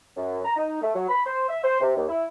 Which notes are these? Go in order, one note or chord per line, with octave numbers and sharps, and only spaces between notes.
F#2
A#5
D#4
A3
F#3
B5
C5
E5
C5
C3
D#2
E4